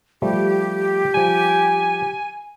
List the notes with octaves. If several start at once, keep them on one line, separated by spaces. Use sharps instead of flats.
F3 G3 A3 G4
F3 G3 G#5